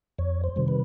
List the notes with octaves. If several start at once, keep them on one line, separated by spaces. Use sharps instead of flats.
F2 C#5
C5
C3 D#3 G3
B4